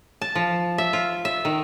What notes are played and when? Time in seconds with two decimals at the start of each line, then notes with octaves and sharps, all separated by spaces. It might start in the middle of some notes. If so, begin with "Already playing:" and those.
0.22 A5
0.35 F3
0.78 E5
0.93 F4
1.25 E5
1.45 D#3